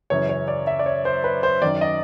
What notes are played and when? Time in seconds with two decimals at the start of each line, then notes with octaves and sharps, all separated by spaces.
0.10 F#2 C#3 E3 C#5
0.29 C#5
0.48 D5
0.67 E5
0.79 D5
0.86 C#5
1.05 C5
1.24 B4
1.43 C5
1.62 F#2 D#3 D5
1.81 D#5